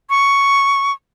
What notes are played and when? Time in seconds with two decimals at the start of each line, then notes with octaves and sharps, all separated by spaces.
0.10 C#6